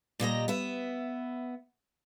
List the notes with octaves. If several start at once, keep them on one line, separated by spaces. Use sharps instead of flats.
A#2 G3 D#5 A#5
B3 E5